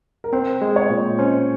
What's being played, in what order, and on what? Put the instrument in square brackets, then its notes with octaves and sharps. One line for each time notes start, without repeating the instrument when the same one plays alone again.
[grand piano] A#4
[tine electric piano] C4 [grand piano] C5
[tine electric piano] G#3
[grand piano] C#5
[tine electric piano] A#2
[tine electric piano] C#4 [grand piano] C5